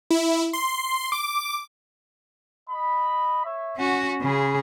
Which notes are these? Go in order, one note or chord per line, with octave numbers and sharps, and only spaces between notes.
E4
C6
D6
D#5 B5
C#5 E5
C#4 F#4 F#5
C#3 C#4 F4 G#4 B5